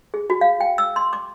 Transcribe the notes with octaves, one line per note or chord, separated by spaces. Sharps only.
G#4
F#4
F5
G5
E6
C6
D6